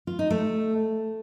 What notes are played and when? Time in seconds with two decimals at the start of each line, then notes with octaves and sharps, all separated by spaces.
0.07 F4
0.19 D#4
0.30 A3